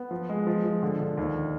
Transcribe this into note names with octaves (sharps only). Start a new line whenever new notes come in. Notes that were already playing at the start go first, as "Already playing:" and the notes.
Already playing: B3
F3
G#3
F3
F3
D3
D3
D#2